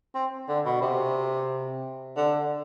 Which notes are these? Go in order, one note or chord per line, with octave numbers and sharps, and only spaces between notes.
C4
D3
B2
C3
D3